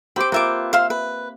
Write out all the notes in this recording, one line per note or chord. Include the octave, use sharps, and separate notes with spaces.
C4 G4 C5 B5 D6
A#3 F4 B4 E5 D6
C5 E5 F5 C6
B4